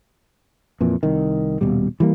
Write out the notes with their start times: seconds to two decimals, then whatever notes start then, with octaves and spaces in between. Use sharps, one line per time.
0.81 F2 A#2 E3
1.03 C2 D#3
1.61 D#1 B2 G3
2.00 E3 G3 A#3